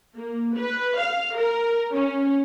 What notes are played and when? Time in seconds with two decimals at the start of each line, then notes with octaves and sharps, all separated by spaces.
0.18 A#3
0.57 B4
0.99 F5
1.37 A#4
1.94 C#4